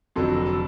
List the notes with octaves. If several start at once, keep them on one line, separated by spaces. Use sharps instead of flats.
F1 F2 D3 F#3 A4
A4